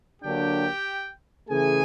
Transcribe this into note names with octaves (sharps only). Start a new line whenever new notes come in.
D3 F#3 A#3 D4 G4 G5
C#3 E3 A3 G#4 G#5